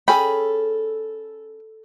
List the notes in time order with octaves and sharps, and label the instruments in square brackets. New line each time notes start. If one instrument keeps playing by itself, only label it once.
[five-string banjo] C#4 G#4 G5 [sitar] A4 [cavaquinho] B5